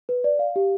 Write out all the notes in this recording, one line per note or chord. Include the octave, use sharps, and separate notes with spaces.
B4
D5
F5
G4